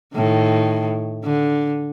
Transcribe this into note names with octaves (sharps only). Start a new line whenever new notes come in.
A2 D#3
D3